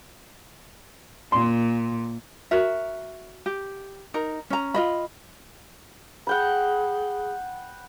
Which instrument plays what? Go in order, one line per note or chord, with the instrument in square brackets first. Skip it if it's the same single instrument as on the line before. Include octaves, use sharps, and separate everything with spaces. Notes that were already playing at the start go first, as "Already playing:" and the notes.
[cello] A#2 [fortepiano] C6
[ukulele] F#4 A#4 E5
G4
D#4 A#4
C#4 A#5
F4 D#5 B5
[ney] G#4 [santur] F#5 G5 B5